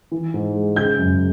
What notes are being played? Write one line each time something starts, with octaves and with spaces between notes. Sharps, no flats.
E3
G#2
G#3
C#3 G6
F#2